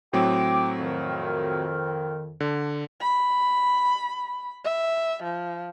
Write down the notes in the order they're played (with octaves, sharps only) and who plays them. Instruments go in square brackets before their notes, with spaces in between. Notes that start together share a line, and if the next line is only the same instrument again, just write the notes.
[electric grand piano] A2 F#3 C4 [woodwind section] G5 D6
[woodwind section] F2 D#3
[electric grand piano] D3
[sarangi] B5
E5
F3